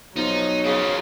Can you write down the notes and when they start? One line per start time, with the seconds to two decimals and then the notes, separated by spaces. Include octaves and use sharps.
0.16 B1 F3 F#3 D#4
0.65 F2 A#2 C#3 E4 F4